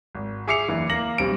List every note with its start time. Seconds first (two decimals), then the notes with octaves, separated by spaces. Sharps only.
0.15 G#1
0.48 G#4 E5 D6 C7 C#7 F7
0.68 F#1 E2 E3
0.90 A#3 A#6 F#7
1.18 B1 G3 C4 D7